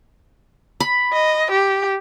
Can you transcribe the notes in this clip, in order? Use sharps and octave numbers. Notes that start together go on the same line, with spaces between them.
B5
D#5
G4